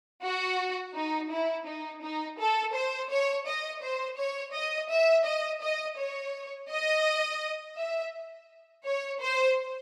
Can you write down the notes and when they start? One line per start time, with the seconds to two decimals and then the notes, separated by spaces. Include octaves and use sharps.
0.25 F#4
0.96 D#4
1.32 E4
1.67 D#4
2.04 D#4
2.40 A4
2.76 C5
3.12 C#5
3.48 D#5
3.83 C5
4.19 C#5
4.55 D#5
4.91 E5
5.26 D#5
5.63 D#5
5.99 C#5
6.70 D#5
7.78 E5
8.86 C#5
9.22 C5